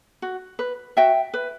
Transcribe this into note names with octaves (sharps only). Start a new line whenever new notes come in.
F#4
B4
F#4 E5 G5
B4